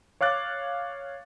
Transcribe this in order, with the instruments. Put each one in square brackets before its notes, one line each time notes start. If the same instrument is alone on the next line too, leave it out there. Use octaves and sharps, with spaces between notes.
[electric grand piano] C#5 F5 D6 F#6 A6